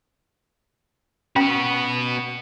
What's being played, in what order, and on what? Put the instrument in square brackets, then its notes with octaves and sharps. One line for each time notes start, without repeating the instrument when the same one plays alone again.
[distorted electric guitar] B3 F#4 [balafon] C#4 G5